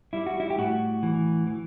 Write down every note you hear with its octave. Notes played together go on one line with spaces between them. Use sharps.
G3 E4
F#4
E4
G4
A2 F#4
E3
E3